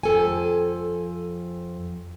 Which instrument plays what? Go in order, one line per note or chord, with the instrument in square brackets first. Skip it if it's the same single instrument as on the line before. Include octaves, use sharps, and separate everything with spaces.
[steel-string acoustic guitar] F2 A4 G#5